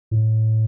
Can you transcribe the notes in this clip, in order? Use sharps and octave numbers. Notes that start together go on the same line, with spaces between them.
A2